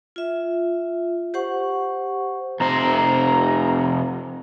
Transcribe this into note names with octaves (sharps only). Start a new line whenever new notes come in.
F4 E5
G4 C5 F#5 C#6
F1 F2 C3 C5 A#5